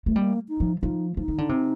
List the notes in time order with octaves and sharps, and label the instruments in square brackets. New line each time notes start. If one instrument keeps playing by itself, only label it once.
[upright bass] A3
[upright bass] G3 [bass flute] A#3
[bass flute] D#4
[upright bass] F3
[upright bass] F3 [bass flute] D#4
[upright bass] F3 [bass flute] D#4
[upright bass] D#3
D3
C3